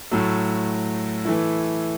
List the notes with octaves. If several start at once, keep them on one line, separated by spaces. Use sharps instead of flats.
A2 F#3 A3
E3 A3 E4